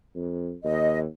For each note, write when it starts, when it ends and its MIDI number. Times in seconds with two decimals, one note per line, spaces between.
0.15 0.53 41
0.64 1.05 39
0.64 0.99 75